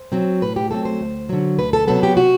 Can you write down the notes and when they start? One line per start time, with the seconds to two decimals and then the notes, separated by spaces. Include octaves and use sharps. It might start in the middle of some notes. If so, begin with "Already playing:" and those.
Already playing: C5
0.12 F#3 C4
0.42 A2 B4
0.56 G4
0.71 F#3 A3 C4 A4
0.85 C5
1.00 D2
1.29 D3 F#3
1.59 D2 B4
1.73 A4
1.88 C3 F#3 B3 A4
2.03 G4
2.17 C3 F#4